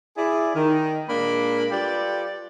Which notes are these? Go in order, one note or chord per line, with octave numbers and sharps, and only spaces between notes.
E4 G#4 D5
D#3
A#2 G#3 A#3 D4 B5
G3 F4 G4 A4 B4 D5